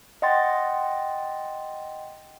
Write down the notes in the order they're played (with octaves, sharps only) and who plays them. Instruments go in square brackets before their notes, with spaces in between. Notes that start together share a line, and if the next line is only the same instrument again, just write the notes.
[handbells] D#5 F#5 G5 C6 A6